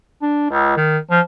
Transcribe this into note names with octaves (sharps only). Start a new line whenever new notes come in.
D4
C#2
D#3
F3